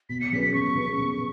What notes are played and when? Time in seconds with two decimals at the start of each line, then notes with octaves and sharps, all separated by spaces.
0.09 B2 B6
0.20 C#7
0.32 F#3 C#4 G#4 B4 B6
0.43 B6
0.53 B2 C#6
0.75 F#3 C#4 G#4 B4
0.97 B2